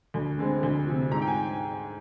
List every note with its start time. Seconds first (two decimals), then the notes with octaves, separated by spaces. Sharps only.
0.14 D2
0.39 D3 G#3 C4
0.63 D2
0.87 C3 F3
1.11 G#2 A#5
1.22 G5
1.27 G#5